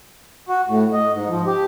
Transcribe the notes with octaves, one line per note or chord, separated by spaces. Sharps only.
F#4
A2
D#5
G#2
F3
G4